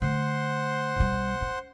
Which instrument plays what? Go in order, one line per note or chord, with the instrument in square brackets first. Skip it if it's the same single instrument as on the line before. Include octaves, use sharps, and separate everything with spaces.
[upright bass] D3 A3 [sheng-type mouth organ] C5 F#5 C6
[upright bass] B1 G3
C#4